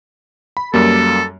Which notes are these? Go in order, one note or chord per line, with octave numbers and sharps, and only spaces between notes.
B5
F#2 G3 A#3 A4